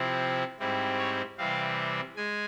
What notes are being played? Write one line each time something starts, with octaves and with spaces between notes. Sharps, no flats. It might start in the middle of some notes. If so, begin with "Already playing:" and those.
Already playing: C3 F3 C4 E4
G#2 G3 C4 E4
C#5
C3 E3 G3 C4 F5
G#3 G#5